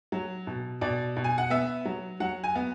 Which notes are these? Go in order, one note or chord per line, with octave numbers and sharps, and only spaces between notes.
F#3
B2
B2 D5
B2
G#5
F#5
B3 E5
F#3
F#3 F#5
G#5
B3